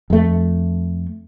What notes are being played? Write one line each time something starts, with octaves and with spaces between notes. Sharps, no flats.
F2 A3